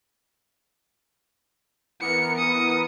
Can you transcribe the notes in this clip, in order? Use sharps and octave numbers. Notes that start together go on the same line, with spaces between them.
E3 B3 A#4 C#7
D#6 C#7